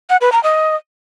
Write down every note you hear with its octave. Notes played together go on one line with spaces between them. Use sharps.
F#5
B4
A#5
D#5